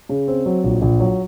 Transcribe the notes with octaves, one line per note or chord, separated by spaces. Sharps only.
C#3
C4
F#3
A#1
A#1
F#3